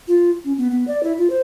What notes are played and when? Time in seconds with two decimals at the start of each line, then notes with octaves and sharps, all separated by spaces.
0.08 F4
0.44 C#4
0.58 B3
0.71 B3
0.88 D5
1.03 E4
1.18 F4
1.30 C5